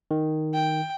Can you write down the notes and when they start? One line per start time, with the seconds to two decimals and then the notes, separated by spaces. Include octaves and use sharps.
0.11 D#3
0.54 G5